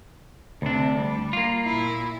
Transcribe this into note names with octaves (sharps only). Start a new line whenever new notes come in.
D2 C3 D4
G3
A#3 F4
A#2 E4